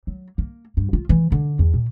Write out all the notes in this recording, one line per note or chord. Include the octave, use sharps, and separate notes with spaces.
F#3
A#3
G2
F4
E3
D3
E2
A#2